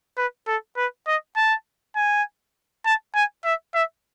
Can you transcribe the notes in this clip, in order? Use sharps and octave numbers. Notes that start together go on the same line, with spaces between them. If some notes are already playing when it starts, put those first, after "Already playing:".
B4
A4
B4
D#5
A5
G#5
A5
G#5
E5
E5